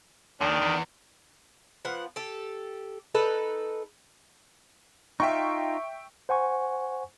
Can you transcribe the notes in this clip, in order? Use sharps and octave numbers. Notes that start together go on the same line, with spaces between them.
D#2 D#3 D4
E2
F3 B3 F#5
G4 A4
D#4 A4 B4
D#4 F4 E5 G5 C#6
C5 F#5 G#5 C#6